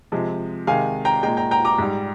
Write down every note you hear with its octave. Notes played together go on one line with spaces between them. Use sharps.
C3 F3 G#3
C3 D#3 G#3 F5 G#5
G5 A#5
A#2 G#3 G5 A#5
G5 A#5
G5 A#5
A#5 D6
G#2 G3